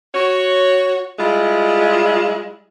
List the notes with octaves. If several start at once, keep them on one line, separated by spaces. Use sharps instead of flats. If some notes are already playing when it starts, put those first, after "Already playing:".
F#4 C#5
G3 G#3 E4 F4